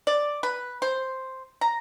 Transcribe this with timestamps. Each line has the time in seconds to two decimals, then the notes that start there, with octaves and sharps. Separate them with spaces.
0.07 D5
0.43 B4
0.82 C5
1.61 A#5